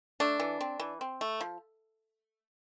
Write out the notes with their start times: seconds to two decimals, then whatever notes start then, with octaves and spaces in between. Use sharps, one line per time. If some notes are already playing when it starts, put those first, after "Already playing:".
0.20 A3 D4
0.40 E3
0.61 C4
0.80 E3
1.01 C4
1.21 A3
1.41 F3